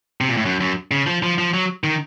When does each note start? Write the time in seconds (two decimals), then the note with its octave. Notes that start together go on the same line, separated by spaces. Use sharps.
0.21 C3
0.29 A#2
0.37 A2
0.45 F#2
0.60 F#2
0.91 C#3
1.06 F3
1.23 F3
1.39 F3
1.54 F#3
1.84 D#3